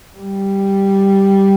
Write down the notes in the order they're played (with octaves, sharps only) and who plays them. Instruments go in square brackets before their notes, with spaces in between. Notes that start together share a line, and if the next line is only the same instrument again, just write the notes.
[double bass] G3